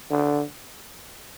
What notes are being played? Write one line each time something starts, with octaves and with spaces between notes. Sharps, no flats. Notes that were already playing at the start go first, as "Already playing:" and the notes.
D3